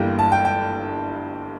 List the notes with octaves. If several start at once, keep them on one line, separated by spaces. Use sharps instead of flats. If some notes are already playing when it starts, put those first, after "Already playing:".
Already playing: G1 G2 E3 G3 A#3 G5
A5
G5
G5